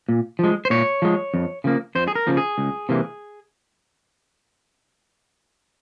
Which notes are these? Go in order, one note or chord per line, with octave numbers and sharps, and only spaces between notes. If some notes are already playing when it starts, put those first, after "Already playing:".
A#2
F3 G#3
C5
A#2 C#5
F3 G#3
F2
C#3 F3 A#3
F2 C5
G#4
A#4
C#3 F3 A#3
G#4
C#2
C3 E3 A#3